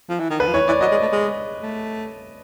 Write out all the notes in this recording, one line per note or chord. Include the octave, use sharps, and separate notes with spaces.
F3
E3
D#3
D3 B4
F3
E3 C#5
E3 D5
F#3 D#5
G#3
A3
G#3
A3